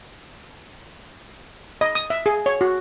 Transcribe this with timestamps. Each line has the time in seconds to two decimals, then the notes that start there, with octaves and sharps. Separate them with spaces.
1.81 D#5
1.95 D#6
2.10 E5
2.26 G#4
2.46 C#5
2.61 F#4